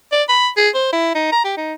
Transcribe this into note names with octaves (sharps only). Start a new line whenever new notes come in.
D5
B5
G#4
C5
E4
D#4
A#5
G4
D#4